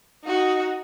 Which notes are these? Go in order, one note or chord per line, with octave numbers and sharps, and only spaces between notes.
D#4 F#4